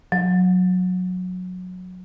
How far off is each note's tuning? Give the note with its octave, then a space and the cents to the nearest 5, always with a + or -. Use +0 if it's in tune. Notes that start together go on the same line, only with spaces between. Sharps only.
F#3 -20